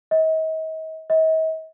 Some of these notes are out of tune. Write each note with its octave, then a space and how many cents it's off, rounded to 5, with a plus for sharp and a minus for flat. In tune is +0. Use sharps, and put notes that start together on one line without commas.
D#5 +40
D#5 +45